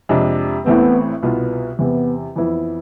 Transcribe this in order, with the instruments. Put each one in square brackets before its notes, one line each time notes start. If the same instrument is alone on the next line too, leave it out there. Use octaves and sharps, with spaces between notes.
[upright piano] F2 C3 G#3 D4
[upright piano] A1 A2 E3 A3 C4 [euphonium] B3
[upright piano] C2 B2 B3 F4
[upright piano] E2 C3 E3 [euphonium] B3
[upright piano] F2 E3 B3 E4